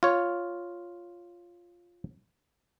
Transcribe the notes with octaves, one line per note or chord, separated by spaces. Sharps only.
F4 C#5